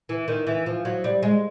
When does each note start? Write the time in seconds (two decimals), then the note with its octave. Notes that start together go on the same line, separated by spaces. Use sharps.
0.09 E3
0.28 D#3
0.47 E3
0.66 F3
0.85 F#3
1.04 G3
1.23 G#3